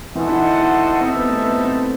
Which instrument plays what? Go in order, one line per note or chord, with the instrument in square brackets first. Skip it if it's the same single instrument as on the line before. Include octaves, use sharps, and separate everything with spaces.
[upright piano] E3 [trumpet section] F#4 A4 C5 D#5 F#5
[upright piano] E4
D#4
E4
[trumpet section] G3 D#4 A4 E5 [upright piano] C4
[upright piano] B3
A3
C4
B3
C4